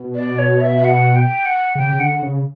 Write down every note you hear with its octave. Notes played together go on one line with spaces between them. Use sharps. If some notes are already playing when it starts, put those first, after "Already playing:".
Already playing: B2
D5
C#5
E5
E5
F#5
G5
F#5
C#3 G5
C#3
D3 F#5
C#3